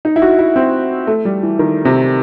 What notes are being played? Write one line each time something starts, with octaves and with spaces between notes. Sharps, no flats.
D#4
E4
F#4
E4
C4
A3
G3
E3
D#3
C3